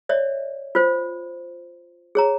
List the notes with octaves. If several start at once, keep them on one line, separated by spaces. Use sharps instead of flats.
C#5 D5 E5
F4 C5
G#4 C#5 A#5